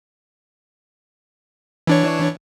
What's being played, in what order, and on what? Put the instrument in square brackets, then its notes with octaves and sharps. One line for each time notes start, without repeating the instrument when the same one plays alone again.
[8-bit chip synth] E3 D4 C#5